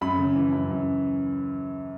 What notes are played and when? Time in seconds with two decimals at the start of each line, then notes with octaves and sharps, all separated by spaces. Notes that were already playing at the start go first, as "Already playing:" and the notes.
0.01 F#2 B5
0.19 C#3
0.36 E3
0.52 F#2
0.70 F#2